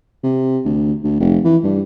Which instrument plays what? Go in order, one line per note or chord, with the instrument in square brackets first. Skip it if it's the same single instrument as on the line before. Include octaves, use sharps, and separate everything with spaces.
[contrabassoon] C3
D2
D2
F1
E3
G2